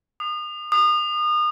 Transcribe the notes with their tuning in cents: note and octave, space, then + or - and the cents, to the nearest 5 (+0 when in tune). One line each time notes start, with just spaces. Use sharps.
D#6 -35
D#6 -35